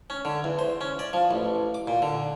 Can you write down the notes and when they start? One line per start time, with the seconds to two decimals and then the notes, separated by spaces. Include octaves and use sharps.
0.10 C#4
0.25 D3
0.44 E2
0.59 C5
0.81 C#4
0.99 D5
1.13 F3
1.31 A1
1.74 D6
1.87 A#2
2.02 D3